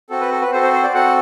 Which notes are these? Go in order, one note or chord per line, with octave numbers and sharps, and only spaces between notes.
C4 F#4 A4
B4
A4
B4
C4 F#4 A4 C5
C5
C5
D5
C4 F#4 A4 F#5